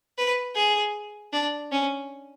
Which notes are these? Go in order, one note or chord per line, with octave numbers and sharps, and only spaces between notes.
B4
G#4
D4
C#4